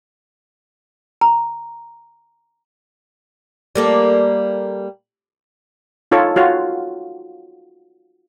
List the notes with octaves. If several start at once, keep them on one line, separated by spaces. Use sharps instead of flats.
A#5
G3 A#3 A4
D#4 F4 A4 C#5
F4 F#4 C#5 F5